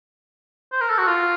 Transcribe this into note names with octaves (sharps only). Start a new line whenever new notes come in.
C5
A#4
A4
F#4
F4